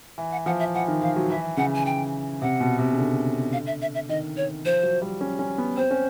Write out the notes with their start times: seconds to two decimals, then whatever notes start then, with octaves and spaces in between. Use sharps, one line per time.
0.18 E3
0.32 F#5
0.46 F3 F#5
0.60 E5
0.74 E3 F#5
0.88 D#3
1.02 F3 F5
1.16 F#3
1.29 E3 E5
1.57 C#3 F#5
1.75 G#5
1.86 G5
2.42 C3 F#5
2.60 B2
2.79 C3
2.93 C#3
2.97 D3
3.53 F5
3.67 E5
3.82 E5
3.95 E5
4.09 D#3 D#5
4.37 C#5
4.65 F3 C5
4.83 F#3
5.02 G3
5.21 C#4
5.39 C#4
5.58 B3
5.77 C4 C5
5.91 C#4